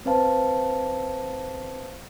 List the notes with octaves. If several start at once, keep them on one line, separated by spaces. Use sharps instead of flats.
C4 B4 C5 F5 A5